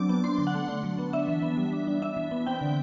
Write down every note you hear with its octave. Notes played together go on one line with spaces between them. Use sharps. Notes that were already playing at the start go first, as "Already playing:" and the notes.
Already playing: F#3 C4 D4 D6
B3
D4 C6
D3
F#5
A3
D4
F#3
B3
D4 E5
E3
B3
G3
D4
D4
D4 E5
E3
B3
C4 G5
D3